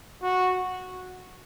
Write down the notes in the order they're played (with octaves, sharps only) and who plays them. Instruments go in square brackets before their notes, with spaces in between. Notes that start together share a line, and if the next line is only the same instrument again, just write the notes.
[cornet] F#4